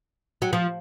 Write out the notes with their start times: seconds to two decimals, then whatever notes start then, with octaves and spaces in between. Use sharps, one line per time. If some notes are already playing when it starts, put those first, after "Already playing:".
0.42 F#3
0.53 F3